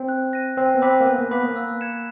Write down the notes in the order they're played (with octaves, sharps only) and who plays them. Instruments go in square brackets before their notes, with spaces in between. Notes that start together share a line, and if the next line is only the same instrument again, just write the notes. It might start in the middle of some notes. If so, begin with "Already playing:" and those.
Already playing: [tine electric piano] C4
[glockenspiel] F#6
A#6 D#7
[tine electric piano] C4 [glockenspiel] G#5
[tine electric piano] B3
[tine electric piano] C4 [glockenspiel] B5 D6 F#6 B6
[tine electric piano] A#3
[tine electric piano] B3 [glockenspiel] G#5
[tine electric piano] A#3
[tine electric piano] B3 [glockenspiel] B5 D6 F#6 B6
[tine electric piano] A#3
[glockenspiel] E6
G#6 C#7 E7